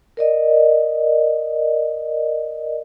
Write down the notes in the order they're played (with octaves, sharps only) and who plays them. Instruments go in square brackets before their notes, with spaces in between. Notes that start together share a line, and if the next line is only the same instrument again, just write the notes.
[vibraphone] A#4 D5 D#5